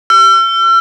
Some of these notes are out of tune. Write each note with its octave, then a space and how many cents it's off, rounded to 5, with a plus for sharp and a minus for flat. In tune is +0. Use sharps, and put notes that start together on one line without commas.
E6 +45